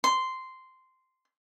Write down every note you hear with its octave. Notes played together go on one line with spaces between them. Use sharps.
C6